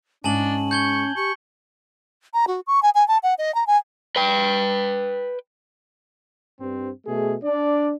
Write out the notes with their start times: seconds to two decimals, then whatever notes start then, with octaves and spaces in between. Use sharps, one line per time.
0.24 G#2 G#3 C#4 D4 G#5 A5 F#7
0.71 C#6 G6 G#6 G7
1.16 G4 C#6
2.34 A#5
2.47 F#4
2.67 C#6
2.83 G#5
2.95 G#5
3.08 A5
3.23 F#5
3.38 D#5
3.55 A#5
3.67 G#5
4.16 B4 G5
6.60 G2 C4
7.05 B2 A3 G#4
7.43 D4 D5